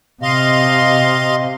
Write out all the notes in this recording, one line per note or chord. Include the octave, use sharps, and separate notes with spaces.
C3 D#5 F5 C6